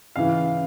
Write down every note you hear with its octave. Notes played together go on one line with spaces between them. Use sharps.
C#3 E3 F5